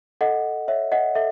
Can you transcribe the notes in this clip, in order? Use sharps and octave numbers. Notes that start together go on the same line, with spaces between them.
A4 D#5 F#5
C#5 E5
D#5 F#5
A4 E5